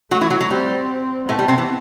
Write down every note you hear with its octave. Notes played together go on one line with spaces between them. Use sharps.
F#3 A3 F#4
E3 E4
F#3
F#3
G3 C4
A2 A3 B3
G3
C3 C4
E3